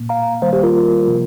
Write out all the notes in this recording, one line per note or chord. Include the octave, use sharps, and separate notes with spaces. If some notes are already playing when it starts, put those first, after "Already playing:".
Already playing: A#2 A#3
F5 A#5
D#3 G3 A#3 C5 F5
G4 C5
F4 A#4
C3 F3 A#3